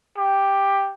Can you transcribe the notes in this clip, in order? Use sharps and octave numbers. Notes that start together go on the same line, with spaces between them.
G4